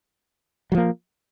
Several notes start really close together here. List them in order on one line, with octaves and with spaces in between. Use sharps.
F#3 F3 A#3